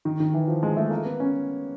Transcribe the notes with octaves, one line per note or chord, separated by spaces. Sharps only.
D#3
D#3
E3
F3
G#3
A3
A#3
B3
C#4